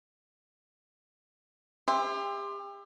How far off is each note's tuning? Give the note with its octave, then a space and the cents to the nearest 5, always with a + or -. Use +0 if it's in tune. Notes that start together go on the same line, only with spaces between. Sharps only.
G4 +35 E5 +0 C6 +0